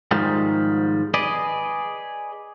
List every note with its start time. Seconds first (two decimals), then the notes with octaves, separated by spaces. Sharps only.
0.11 G#2 D#3 F3 G3 G#3
1.14 G#4 B4 D5 D#5